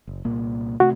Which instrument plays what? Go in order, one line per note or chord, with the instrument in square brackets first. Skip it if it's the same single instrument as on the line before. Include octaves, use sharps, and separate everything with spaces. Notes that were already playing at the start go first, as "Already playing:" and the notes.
[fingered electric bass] F#1
C2 A#2 A#3
[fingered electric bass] C3 A3 [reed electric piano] F#4